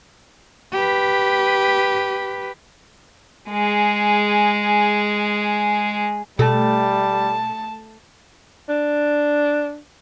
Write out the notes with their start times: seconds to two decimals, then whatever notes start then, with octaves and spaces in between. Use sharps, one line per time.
0.72 G4 B4
3.50 G#3 G#4
6.39 B2 G3 A3 A5
8.69 D4